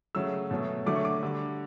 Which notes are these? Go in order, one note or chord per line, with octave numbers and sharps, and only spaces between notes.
C#3 F#3 A3 E6
B2 F#3 A3
D3 F#3 A3 D6
C#6
D6
D3 G3